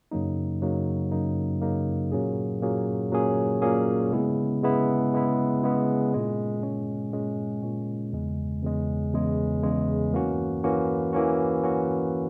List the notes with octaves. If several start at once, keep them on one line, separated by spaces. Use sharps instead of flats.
F#2 C#3 F#3 A#3 D#4
F#2 C#3 F#3 A#3 D#4
F#2 C#3 F#3 A#3 D#4
F#2 C#3 F#3 A#3 D#4
A#2 F#3 A#3 C#4 G#4
A#2 F#3 A#3 C#4 G#4
A#2 F#3 A#3 C#4 G#4
A#2 F#3 A#3 C#4 G#4
C#3 G#3 B3 E4
C#3 G#3 B3 E4
C#3 G#3 B3 E4
C#3 G#3 B3 E4
A#2 G#3 C#4
A#2 G#3 C#4
A#2 G#3 C#4
A#2 G#3 C#4
E2 C#3 G#3
E2 C#3 G#3
E2 C#3 G#3
E2 C#3 G#3
E3 A#3 C#4 F#4
E3 A#3 C#4 F#4
E3 A#3 C#4 F#4
E3 A#3 C#4 F#4